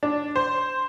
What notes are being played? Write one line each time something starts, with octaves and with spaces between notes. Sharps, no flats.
D4
C5